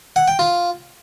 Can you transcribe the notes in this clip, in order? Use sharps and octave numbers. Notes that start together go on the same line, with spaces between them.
F#5
G5
F4